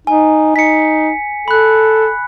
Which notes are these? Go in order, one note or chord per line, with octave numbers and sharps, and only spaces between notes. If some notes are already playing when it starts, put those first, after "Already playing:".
D#4 G#5
D#4 B6 C#7
A4 B5 F#6